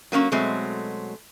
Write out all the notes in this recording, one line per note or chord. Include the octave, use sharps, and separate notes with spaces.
F#3 A#3 B3 C#4
B2 F#3 G#3 A3 C4